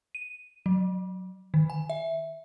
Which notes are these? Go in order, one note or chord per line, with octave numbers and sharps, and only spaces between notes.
D#7
F#3
D#3
G#5
E5